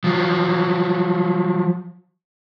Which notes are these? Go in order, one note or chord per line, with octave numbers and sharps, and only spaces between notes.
F3 F#3